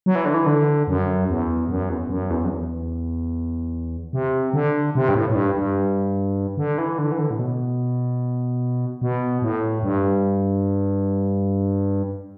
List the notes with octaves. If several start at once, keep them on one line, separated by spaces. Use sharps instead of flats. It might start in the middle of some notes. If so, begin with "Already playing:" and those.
F#3
E3
D3
E3
D3
F#2
E2
F#2
E2
F#2
E2
F#2
E2
C3
D3
C3
G2
A2
A2
G2
G2
D3
E3
D3
E3
D3
A2
B2
B2
A2
G2